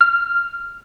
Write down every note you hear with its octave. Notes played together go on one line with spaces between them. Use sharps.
F6